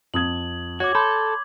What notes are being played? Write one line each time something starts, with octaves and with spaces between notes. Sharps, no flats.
F2 D#6 G#6 F#7
F#4 C#5 D6 G#6
A4 B5 C6 G6